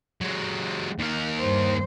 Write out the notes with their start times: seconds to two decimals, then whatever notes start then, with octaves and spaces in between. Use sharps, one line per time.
0.21 F#3 G#3
0.99 D#2 A#4
1.40 G2 C5